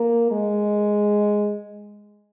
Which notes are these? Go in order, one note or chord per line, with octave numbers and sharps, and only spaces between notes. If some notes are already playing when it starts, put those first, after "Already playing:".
Already playing: A#3
G#3